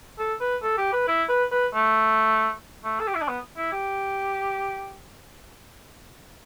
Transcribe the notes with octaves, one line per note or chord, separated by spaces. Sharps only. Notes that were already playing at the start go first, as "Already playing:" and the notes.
A4
B4
A4
G4
B4
E4
B4
B4
A3
A3
A4
G4
E4
D4
B3
E4
G4